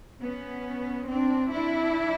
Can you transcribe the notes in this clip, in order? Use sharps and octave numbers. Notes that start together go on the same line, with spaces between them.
B3 C#4
C4 D4
D4 E4